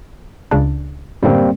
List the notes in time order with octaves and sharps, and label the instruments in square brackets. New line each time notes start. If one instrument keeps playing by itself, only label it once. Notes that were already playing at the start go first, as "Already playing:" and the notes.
[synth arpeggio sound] C#2 C#3 D4
[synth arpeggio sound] F#2 A2 D3 [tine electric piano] G3 A#3 C4